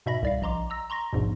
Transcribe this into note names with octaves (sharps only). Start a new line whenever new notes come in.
G#2 B2 E5 B5 A#6
C2 D5 F5
A#1 D#5 A#5 C6 D6
A#5 E6 A#6
A#5 C6 C#6 A#6
A#1 E2 G#2 B2